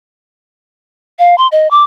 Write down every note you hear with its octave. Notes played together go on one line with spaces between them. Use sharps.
F5
C6
D#5
D6